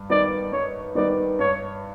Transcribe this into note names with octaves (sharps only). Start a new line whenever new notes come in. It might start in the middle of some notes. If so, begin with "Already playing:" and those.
Already playing: G2
D#3 G3 B3 D#4 D5
G2 C#5
D#3 G3 B3 D#4 D5
G2 C#5